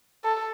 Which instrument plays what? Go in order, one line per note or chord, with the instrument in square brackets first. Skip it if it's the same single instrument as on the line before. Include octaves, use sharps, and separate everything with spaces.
[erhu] A4